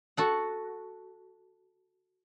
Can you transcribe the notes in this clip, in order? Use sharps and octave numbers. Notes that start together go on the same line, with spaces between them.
F#4 A4 F#5